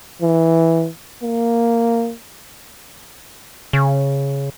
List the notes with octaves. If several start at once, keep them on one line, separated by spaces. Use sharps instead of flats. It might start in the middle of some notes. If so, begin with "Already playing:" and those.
E3
A#3
C#3